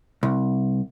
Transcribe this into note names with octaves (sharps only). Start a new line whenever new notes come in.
C2